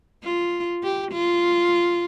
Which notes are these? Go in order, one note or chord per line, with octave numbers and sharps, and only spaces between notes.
F4
G4
F4